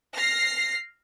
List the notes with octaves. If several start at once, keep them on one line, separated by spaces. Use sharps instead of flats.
F6 A#6 C7